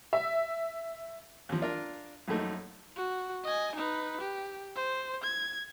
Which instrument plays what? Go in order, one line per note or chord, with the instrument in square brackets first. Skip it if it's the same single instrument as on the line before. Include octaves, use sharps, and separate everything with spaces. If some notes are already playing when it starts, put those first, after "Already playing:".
[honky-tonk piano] E5
[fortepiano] D#2 F3
D4 F4 A#4
A#1 F#2 A3 D#4
[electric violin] F#4
D#5 G#5
D#4 B4
G4
C5
G#6